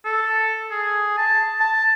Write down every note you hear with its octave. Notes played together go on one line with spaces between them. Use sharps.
A4
G#4
A5
A5